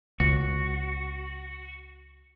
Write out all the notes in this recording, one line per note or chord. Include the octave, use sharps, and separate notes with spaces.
C#2 F#4